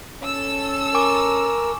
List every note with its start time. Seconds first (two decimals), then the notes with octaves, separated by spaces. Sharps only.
0.23 C#4 A4 E6
0.95 A#4 G#5 C#6 D6